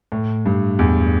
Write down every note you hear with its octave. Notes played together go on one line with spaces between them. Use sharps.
A2
G2
E2